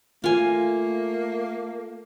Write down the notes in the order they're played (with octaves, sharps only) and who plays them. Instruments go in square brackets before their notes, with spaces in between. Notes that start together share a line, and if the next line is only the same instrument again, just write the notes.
[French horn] A3 [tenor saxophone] A#3 [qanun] F4 G#5